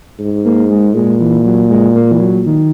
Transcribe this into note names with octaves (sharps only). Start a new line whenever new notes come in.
G#2
A#3
G#3
A#2 G#3
E3
F#3
G#3
A#3
E3
F#3
D#3